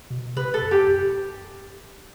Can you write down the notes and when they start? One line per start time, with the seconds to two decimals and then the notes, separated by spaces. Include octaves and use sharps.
0.10 B2
0.36 C3 B4
0.54 A4
0.62 F#2
0.71 G4
0.88 F#2